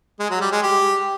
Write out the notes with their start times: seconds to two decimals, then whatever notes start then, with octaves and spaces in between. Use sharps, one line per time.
0.19 G#3
0.30 F#3
0.41 G3
0.52 G#3
0.62 G4